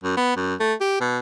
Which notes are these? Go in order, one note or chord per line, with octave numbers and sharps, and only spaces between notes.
F#2
B3
F#2
A3
G4
B2